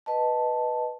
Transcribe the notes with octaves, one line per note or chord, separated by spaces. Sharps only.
B4 D#5 A5